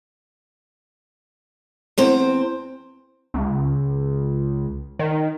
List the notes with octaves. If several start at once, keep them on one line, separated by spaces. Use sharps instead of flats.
E2 C4 C5
C#2
D#3